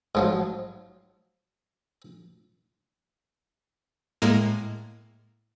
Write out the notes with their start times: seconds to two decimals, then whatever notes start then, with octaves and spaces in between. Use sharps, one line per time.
0.15 G#2 F3 F#3
4.22 A2 G#3 A#3